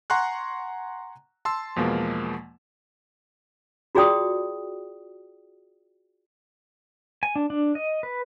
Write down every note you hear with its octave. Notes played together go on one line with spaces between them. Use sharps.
F#5 G#5 A#5 C6 C#6 F#6
A5 C6 E6
E2 B2 F3 G#3 A#3
F4 F#4 G#4 D5 G5 D#6
G#5
D4
D4
D#5
B4